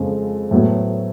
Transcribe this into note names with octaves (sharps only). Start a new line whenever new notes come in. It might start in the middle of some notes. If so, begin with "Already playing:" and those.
Already playing: F2 C#3 F3 G#3
A2 F#3 B3